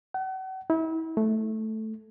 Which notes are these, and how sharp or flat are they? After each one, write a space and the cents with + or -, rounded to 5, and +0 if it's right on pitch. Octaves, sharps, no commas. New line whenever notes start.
F#5 +40
E4 -35
A3 -5